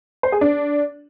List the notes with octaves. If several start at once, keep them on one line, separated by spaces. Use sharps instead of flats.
C5
G#4
D4